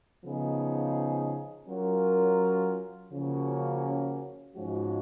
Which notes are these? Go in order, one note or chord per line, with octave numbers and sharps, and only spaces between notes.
C#3 F3 B3 D#4 G#4
F#3 C#4 F4 A#4
C#3 F3 A#3 C#4 F#4
G#2 F3 G#3 C#4 F#4